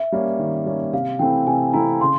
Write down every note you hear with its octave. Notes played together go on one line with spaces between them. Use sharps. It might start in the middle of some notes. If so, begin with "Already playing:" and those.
Already playing: E5
G3 A#3 C#4
D#3
G3 A#3 C#4
C3 F5
E3 A3 C4 E4 G5
C3 G#5
E3 A3 C4 E4 A#5
C#3 C6